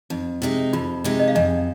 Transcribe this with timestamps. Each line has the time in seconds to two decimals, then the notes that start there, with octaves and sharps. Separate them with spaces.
0.10 F2 D#4
0.42 C3 G#3 D#4
0.73 F2 F4
1.04 C3 G#3 D#4
1.19 D#5
1.28 F5
1.35 F2 D#5 G#5